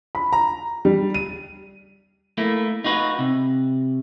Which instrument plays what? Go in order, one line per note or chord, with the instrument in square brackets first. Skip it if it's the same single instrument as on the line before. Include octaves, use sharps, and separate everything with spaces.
[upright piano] B5
A#5
G3
D#7
[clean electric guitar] A3 A#3 E4
D#4 F4 F#4 B4
C3